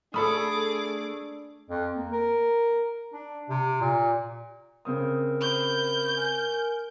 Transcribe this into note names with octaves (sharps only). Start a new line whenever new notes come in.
A3 D4 G#4 A4 B5 D6 D#6
F2
A#3
A#4
D4
C3
A#2
C#3 C4 A#4 D#6
C5 B5 C#6 G6
G#5